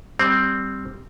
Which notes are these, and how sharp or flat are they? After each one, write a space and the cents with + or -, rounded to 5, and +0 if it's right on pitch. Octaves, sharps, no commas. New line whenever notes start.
G3 +0 C4 +0